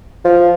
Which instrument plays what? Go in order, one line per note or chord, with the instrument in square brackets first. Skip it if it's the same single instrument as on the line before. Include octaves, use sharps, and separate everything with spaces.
[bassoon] F3